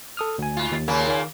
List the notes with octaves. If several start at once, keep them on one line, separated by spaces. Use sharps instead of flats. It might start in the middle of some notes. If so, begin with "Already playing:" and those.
A4 D#6 F6
D2 G#5
G#2 F4
D#2
A#2 C#3 A#3
D#3 F5